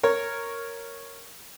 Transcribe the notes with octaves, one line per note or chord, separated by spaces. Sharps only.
A#4 C#5